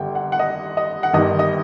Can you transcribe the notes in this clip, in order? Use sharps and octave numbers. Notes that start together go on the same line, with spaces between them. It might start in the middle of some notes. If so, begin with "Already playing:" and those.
Already playing: G1 G2 D3 G5
F#5
F#5
D#5
D#5
F#5
G1 G2 D#3 D#5
D#5